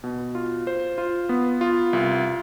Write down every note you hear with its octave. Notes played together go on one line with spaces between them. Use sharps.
B2
F4
C5
F4
B3
F4
C2